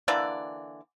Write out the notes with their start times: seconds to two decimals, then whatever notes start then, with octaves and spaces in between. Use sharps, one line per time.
0.08 D3 E3 A#3 D5